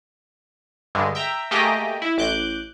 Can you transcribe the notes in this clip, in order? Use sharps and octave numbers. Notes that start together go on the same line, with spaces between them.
G2 D3 G#3
E5 G5 A#5
A3 A#3 G4 G#4 D#5 G5
E4
A1 D6 F#6 G6